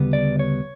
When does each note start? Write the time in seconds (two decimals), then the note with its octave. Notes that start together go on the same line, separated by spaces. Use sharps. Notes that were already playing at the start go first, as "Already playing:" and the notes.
Already playing: D2 C#3 G3 B3
0.13 D5
0.39 C#5